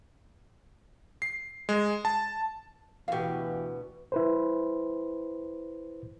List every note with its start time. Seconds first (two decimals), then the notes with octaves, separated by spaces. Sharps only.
1.22 C7
1.69 G#3
2.05 A5
3.08 D2 B2 E3 G4 F5
4.12 E4 B4 C5